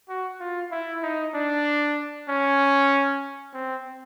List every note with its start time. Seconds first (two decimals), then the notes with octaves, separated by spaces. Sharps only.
0.09 F#4
0.40 F4
0.72 E4
1.03 D#4
1.34 D4
2.29 C#4
3.54 C4